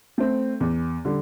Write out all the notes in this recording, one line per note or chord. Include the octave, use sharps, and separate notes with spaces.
A3 C4
E2
D3 G3